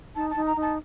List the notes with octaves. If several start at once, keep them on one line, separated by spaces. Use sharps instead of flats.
D#4 A5
A5
D#4
A#5
D#4
A5